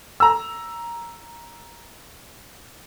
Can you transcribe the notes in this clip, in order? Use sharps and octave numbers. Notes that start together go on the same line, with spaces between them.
A#5 E6